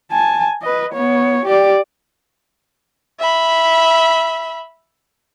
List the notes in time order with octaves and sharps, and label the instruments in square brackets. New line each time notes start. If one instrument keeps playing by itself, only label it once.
[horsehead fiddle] G#5 A5
B4 D#5
B3 C#5
G4 D5
[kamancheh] E5 B5